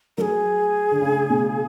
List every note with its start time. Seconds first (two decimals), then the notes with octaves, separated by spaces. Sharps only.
0.18 F#3 G#4 A#4
0.91 D3
1.01 C#3
1.30 B2